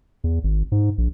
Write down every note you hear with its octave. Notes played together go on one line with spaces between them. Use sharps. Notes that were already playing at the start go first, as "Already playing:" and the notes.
E2
G#1
G#2
A#1